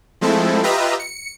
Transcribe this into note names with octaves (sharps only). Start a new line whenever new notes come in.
F3 G#3 A3 C4 E4 A4
F4 G4 B4 D#5 E5 A#5
C#7